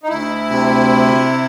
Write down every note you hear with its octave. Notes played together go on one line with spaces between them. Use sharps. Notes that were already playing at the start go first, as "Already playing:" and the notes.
D#4
D2 E4
C3